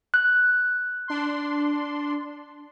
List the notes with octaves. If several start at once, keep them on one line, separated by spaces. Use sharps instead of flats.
F#6
D4 C6